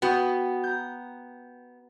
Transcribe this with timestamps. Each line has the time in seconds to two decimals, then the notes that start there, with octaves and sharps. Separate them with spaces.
0.02 B3 F#4 G5 D#6
0.64 A#5 G6